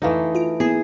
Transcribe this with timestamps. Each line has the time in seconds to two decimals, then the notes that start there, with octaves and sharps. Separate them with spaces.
0.02 F2 E3 A3 D#4 F5 D#6
0.35 F4 D7
0.60 A#3 B3 E4 G#4